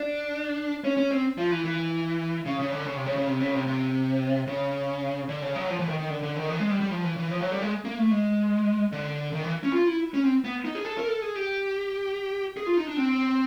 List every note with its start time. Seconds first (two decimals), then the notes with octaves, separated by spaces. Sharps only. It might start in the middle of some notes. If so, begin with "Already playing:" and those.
Already playing: D4
0.84 C#4
0.97 C#4
1.11 C4
1.38 F3
1.51 E3
1.65 E3
2.46 C#3
2.59 C#3
2.72 D3
2.86 C#3
2.96 C3
3.06 C#3
3.16 C#3
3.27 C3
3.40 C#3
3.54 C3
3.67 C3
4.47 C#3
5.29 D3
5.42 C#3
5.56 F#3
5.69 F3
5.80 E3
5.89 D#3
5.99 D#3
6.10 D3
6.23 D3
6.37 D#3
6.50 E3
6.60 G#3
6.70 G3
6.80 G3
6.90 F3
7.04 E3
7.17 E3
7.31 F3
7.41 F#3
7.51 G3
7.62 G#3
7.85 A#3
7.98 A3
8.11 G#3
8.92 D3
9.33 D#3
9.43 E3
9.63 C#4
9.73 F4
9.87 E4
10.14 C#4
10.24 C4
10.44 B3
10.65 D#4
10.75 G#4
10.85 A4
10.98 A#4
11.08 A4
11.22 G#4
11.36 G4
12.57 G#4
12.67 F4
12.77 D#4
12.87 D4
12.97 C4